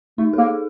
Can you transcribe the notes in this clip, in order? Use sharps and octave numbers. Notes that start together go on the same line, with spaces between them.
A3 D#4
A4
A#3 G#4